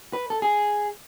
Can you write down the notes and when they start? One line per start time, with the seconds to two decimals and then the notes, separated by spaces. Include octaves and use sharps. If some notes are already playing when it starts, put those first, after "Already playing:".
0.13 B4
0.30 A4
0.42 G#4